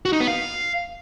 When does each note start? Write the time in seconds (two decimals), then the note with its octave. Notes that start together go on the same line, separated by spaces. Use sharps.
0.05 F#4
0.13 D#4
0.20 B3
0.28 F5